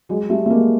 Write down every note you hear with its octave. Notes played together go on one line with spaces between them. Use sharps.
F#3 G#3
G3 A3
A3
G#3 A#3